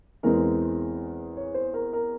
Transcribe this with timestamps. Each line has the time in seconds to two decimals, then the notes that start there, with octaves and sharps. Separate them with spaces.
0.23 E2 E3 G#3 C4 A#4
1.37 C#5
1.54 C5
1.74 A#4
1.93 A#4